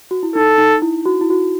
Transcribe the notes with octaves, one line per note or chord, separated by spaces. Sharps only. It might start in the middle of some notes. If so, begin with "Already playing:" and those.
F#4
E4
D#4 A4
D#4
E4
F#4
E4
F#4